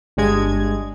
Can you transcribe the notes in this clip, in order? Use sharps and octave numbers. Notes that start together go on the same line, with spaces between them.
G1 G2 G#3 G#6